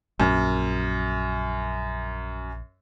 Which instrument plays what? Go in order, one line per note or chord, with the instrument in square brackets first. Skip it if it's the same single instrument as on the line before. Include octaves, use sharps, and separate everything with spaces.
[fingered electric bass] A#1 [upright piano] F#2